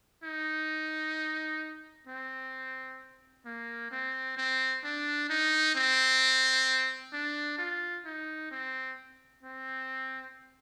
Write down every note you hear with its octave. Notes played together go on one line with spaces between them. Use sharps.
D#4
C4
A#3
C4
C4
D4
D#4
C4
D4
F4
D#4
C4
C4